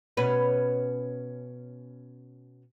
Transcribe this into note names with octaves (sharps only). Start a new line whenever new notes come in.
B2 C#4 B4